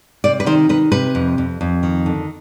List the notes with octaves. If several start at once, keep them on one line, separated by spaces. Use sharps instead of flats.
C3 D5
B4
D#3 C5
D#3 B4
C3 B4
F2
F2
F2
D#3
D3